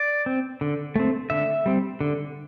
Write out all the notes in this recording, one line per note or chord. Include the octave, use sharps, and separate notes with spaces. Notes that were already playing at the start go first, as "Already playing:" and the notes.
Already playing: D5
C4
D3
A3 C4
D3 E5
G3 C4
D3